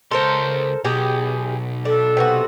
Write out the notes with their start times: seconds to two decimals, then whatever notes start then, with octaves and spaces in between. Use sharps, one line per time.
0.11 C#2 A4 A#4 C5 C6
0.85 B1 B2 G4 G#4
1.85 D4 A4
2.17 C3 B3 F#4